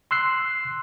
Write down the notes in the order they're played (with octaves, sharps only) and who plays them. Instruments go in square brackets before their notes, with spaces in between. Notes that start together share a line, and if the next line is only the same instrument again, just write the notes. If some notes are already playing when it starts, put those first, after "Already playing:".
[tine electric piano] C6 E6 F#6 C7